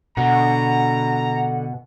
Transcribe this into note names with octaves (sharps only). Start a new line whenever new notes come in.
B2 D3 F#5 A#5